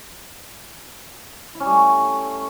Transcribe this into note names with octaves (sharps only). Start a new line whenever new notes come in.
E4
C#4
G3
A3